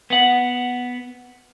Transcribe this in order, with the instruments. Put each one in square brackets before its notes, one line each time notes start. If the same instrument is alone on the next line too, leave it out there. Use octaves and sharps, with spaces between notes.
[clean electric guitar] B3 F#5